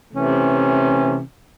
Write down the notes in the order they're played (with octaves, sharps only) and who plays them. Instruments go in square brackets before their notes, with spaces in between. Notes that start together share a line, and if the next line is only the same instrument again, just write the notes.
[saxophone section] C3 E3 A3 C#4